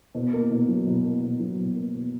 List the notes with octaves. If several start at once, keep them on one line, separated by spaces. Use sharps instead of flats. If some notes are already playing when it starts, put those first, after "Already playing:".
B2
A#3
B2
F#3
B2
A#3
B2
F#3
B2
A#3
B2